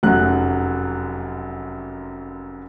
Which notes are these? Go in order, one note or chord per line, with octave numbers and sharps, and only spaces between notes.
F1 F#2 F#3 F#6